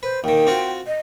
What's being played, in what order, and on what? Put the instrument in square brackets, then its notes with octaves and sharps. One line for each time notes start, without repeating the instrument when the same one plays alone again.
[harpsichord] B4 [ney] C5
[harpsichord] D#2 D#3 [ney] G5
[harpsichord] C4 F4 F#4
[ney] D#5